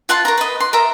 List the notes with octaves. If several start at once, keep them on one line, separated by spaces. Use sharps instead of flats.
F4 F#5 A5 C6
A#4 C#5 A#5
B4 D#5
C6
A#4 E5 A#5